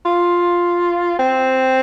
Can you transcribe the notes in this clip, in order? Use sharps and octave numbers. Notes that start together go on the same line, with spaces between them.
F4
C4